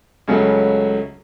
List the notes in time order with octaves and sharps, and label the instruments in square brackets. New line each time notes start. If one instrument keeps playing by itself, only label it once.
[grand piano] C#2 C#3 F#3 A3 C#4